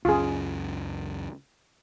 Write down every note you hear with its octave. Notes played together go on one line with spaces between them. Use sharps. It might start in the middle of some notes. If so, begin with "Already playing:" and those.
C#2 F#2 C#4 F4 G#4